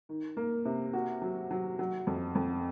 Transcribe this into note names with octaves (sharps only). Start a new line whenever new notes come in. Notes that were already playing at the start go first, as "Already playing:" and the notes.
D#3
A#3
C3
F#4
F#3
F#3
F#3
F2
F2